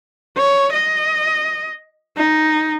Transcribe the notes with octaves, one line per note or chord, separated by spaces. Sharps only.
C#5
D#5
D#4